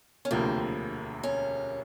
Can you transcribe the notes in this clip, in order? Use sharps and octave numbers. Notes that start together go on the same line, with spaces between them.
C#4
E1 D2 C3 F3 A#3 C4
C#4